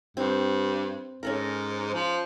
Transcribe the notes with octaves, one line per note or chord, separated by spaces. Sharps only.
G2 C4 C5
G#2 C#4 A4 A#4
F3